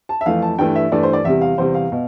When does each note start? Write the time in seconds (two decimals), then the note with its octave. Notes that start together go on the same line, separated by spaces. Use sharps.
0.09 A5
0.21 E5
0.26 F2 E3 A3 F5
0.42 A5
0.58 G2 E3 A3 G5
0.76 E5
0.92 G2 E3 A3 D5
1.03 C5
1.13 D5
1.25 E2 C3 G3 E5
1.41 F5
1.58 E2 C3 G3 C5
1.75 F5
1.92 B2